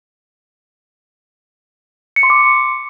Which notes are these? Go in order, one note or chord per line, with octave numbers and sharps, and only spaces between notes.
C#7
C6
D6